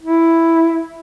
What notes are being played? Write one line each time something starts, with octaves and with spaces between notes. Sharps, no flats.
E4